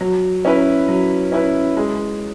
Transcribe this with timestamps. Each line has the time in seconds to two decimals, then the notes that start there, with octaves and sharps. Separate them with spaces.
0.01 F#3
0.45 C#4 E4 B4
0.88 F#3
1.32 C#4 E4 B4
1.77 G#3